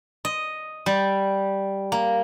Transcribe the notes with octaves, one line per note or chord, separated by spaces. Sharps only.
D#5
G3
A#3